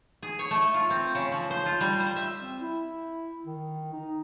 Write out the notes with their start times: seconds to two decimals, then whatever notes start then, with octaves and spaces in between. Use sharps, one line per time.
0.22 G#4
0.39 C#5
0.51 A3
0.74 F4
0.90 C4
1.15 C#3
1.32 F3
1.50 C5
1.66 F4
1.81 G3
2.00 C5
2.16 E5
2.41 C4
2.60 E4
3.45 D#3
3.93 D#4